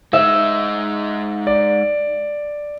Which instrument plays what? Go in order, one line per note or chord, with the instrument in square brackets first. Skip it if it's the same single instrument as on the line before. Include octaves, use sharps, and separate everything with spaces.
[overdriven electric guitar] G#3 D#4 [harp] E5
[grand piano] D5